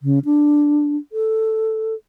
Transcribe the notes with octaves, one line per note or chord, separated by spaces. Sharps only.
C#3
D4
A4